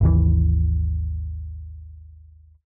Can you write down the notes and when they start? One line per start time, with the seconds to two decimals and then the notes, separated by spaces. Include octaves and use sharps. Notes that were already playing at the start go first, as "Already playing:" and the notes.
0.01 G#1 D#2 E3